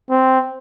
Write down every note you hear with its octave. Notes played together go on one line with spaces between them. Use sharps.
C4